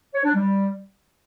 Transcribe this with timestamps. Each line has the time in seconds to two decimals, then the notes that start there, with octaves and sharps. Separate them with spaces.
0.14 C#5
0.25 D4
0.35 G3